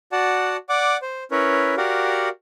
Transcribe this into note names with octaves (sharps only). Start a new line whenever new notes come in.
F#4 D5 F#5 A5
D5 F#5 D6
C5
C#4 E4 A#4 B4 C#5
F#4 G4 A#4 D5 F5 F#5